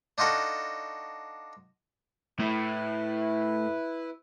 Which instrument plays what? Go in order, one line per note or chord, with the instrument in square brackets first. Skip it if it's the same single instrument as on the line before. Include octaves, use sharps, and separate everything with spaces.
[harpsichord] D4 D#4 F4 F#4 A4
[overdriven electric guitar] A2 [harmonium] E4 B4